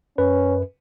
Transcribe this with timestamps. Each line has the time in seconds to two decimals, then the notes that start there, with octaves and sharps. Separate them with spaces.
0.18 F#2 C#4 B4